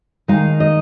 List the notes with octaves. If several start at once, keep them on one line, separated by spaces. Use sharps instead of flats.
D#3 G#3 D#4 F5
D#5